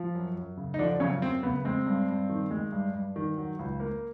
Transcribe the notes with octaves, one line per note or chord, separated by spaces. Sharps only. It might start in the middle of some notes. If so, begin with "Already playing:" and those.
Already playing: F3
F#2
F#2
C#3
D#4
D3 F3 D4
F#2 C#3 C#4
F#2 C4
C#3 B3
G#3 C4
G2
G2
D#3
G#3
G2
G2
D#3
F#3
C#2
A#3